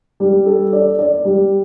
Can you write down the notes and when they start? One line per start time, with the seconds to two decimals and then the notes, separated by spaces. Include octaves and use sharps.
0.20 G3
0.46 A4
0.73 D5
0.99 D5
1.25 G3